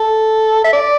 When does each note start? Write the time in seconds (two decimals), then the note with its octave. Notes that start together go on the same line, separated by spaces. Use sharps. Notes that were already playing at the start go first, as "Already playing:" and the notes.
Already playing: A4
0.65 E5
0.73 D5